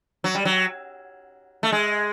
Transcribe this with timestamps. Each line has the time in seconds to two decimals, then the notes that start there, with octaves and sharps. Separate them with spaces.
0.24 F#3
0.35 G3
0.45 F#3
1.63 A3
1.72 G#3